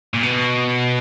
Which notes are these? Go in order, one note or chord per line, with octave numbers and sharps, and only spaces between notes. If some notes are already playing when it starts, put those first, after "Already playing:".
A#2
B2